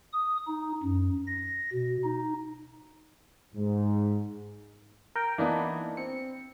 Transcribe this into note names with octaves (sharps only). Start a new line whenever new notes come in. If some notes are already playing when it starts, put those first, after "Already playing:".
D#6
D#4
F#2
A#6
B2
D#4
G#2
A#4 G5
E3 A#3 B3 D4 D#4
C4 C#7